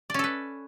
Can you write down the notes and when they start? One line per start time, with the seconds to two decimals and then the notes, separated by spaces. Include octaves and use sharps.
0.10 D5
0.14 C#4
0.19 A4
0.24 B4